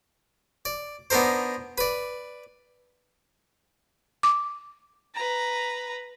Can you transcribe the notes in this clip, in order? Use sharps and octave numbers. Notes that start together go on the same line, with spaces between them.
D5
B3 D4 D#4 A#4 C5
B4 D5
D6
B4 A#5